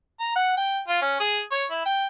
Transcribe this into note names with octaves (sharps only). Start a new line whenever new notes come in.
A#5
F#5
G5
F4
C#4
G#4
C#5
E4
G5